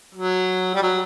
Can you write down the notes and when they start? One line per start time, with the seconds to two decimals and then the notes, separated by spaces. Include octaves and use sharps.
0.15 F#3
0.75 G3
0.83 F#3